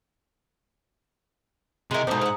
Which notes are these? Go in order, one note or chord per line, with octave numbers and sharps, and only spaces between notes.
C3 G#3 E4 A#4
E2 G#2 B2 A3 C5 D#5 A#5 D#6
G#4 A#4 E5 F#5